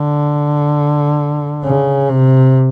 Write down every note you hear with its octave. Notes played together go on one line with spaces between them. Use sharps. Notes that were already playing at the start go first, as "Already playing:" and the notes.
Already playing: D3
C#3
C3